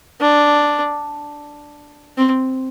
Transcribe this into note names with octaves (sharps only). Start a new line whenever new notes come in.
D4
C4